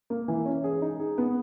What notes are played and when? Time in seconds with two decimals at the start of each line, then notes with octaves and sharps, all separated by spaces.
0.10 A#3
0.28 E3
0.46 C#4
0.64 G#4
0.82 D#4
1.00 G#4
1.18 B3